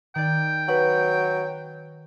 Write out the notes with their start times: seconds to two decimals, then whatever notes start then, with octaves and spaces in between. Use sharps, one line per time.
0.15 D#3 D5 G5
0.68 F#3 B4